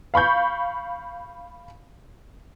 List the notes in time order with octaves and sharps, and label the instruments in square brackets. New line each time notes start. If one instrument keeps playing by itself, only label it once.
[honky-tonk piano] F5 B5 C#6 G6